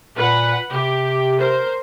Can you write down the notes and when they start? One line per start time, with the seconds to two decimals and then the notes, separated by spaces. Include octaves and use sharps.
0.17 A#2 B4 F#5 B5
0.71 C3 G4
1.39 A#4 C5